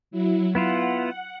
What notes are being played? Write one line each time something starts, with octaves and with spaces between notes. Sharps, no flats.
F#3 E4
B3 E4 F4 F#5